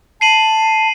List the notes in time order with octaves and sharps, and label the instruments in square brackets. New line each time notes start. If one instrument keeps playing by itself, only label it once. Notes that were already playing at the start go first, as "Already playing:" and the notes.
[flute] A5 [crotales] C7 D#7 F#7